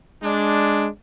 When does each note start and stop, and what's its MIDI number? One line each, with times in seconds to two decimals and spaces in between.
0.23 0.88 56
0.23 0.88 62